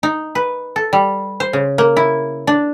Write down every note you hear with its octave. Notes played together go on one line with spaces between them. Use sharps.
D#4
B4
A4
G3
C5
C#3
A#3
E4
D4